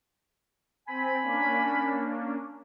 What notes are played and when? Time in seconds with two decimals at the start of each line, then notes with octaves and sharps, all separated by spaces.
0.88 C4 G#5 B5
1.22 A#3 C#4 D4